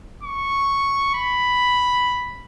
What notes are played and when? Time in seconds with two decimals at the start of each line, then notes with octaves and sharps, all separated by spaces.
0.23 C#6
1.14 B5